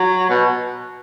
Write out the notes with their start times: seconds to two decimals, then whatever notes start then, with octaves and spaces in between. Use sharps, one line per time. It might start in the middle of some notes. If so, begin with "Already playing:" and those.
Already playing: F#3
0.30 B2